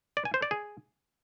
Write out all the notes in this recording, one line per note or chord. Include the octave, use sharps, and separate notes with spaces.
D5
G#5
C5
D5
G#4